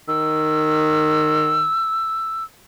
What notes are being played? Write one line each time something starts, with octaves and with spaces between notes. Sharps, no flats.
D#3 E6